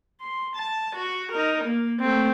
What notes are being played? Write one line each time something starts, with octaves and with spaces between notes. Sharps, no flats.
C6
A5
F#4
D#4 A#4
A#3
A3 C4